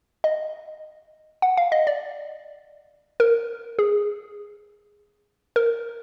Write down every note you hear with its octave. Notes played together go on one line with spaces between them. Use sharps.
D#5
F#5
F5
D#5
D5
A#4
G#4
A#4